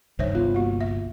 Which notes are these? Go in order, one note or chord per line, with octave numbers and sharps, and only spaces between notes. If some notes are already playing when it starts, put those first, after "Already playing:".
C2 G2 D#3 C5 C#5 E5
G1 C2 B3 F4
A#3 F#4
E5